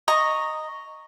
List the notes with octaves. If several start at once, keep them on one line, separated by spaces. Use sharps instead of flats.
D#5 A#5 C#6